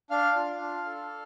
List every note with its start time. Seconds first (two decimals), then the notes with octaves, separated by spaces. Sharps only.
0.11 D4 F5 F6
0.36 F4
0.61 D4
0.86 A4